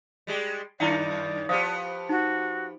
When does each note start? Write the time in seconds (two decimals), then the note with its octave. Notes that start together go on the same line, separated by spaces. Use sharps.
0.27 G3 G#3 G4
0.80 F#2 D#3 D#4 E4 D5 F#5
1.49 F3 B3 G4 C5 F5 D#6
2.09 D#4 F#4